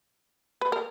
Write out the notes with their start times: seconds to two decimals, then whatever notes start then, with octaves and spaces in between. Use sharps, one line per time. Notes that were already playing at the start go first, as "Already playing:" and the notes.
0.61 B4
0.72 A#4